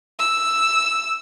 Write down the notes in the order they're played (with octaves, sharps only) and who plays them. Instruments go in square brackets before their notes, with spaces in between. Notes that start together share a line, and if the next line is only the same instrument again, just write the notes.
[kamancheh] E6